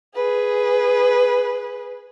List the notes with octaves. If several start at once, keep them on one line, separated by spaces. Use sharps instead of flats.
G#4 B4